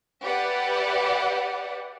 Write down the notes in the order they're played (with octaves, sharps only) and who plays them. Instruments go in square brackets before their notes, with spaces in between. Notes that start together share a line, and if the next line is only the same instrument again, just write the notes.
[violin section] G4 B4 D5 E5 F#5